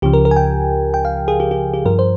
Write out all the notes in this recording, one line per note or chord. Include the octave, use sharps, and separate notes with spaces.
C#2 C#3 F3 G4
A#4
A#4
G#5
G5
G5
F5
G#4
G4
G4
G4
G2 F3 A#4
C5